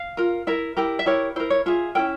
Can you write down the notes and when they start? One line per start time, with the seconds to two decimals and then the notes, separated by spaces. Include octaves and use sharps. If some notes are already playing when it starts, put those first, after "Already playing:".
Already playing: F5
0.17 F4 A#4
0.47 E4 A#4 E5
0.77 E4 G4 A#4
0.99 E5
1.06 E4 G4 A#4 C#5
1.36 E4 A#4 C5
1.50 C#5
1.66 F4 G#4 E5
1.95 C#4 E4 A#4 G5